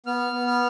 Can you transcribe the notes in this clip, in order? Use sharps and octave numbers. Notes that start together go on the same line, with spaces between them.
B3 F6
B3
F6